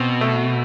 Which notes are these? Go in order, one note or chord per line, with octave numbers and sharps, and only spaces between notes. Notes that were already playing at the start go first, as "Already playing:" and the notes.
Already playing: B2 C4
A3